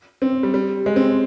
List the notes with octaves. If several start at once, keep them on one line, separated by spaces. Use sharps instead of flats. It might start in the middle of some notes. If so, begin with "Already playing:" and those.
C4
G3
G3
G#3
C4